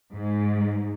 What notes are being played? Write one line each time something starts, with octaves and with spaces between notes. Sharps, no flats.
G#2